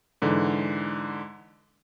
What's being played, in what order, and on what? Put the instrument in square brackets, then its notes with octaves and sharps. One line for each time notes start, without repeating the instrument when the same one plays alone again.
[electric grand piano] G#2 D3 E3